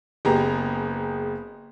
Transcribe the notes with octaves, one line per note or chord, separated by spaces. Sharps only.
F#1 B3 G4 G#4 A#5